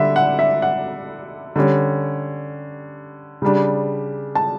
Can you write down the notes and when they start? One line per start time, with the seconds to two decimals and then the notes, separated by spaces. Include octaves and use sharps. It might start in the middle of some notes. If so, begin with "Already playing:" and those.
Already playing: D3 G3 D4 E5
0.16 F#5
0.39 E5
0.62 F#5
1.56 D3 G3 C#4
3.42 C#3 G3 D4
4.35 A5